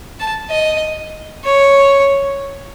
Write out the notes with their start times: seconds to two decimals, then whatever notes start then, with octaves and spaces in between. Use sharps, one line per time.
0.20 A5
0.50 D#5
1.45 C#5